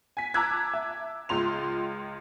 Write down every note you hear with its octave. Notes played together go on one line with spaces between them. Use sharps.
G#5 B6
A5 A#5 D6 E6 F#6 G#6
E5
C#2 F4 C6 F7